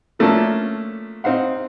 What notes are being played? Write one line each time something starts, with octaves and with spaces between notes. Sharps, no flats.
F3 A3 A#3 C#4 D4 A4
C4 D#4 F5 F#5